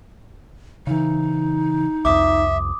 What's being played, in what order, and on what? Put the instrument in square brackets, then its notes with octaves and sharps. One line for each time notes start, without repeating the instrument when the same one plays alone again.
[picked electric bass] C#3 E3 [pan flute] D#4
[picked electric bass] C2 F2 [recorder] E5 [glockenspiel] D6 D#6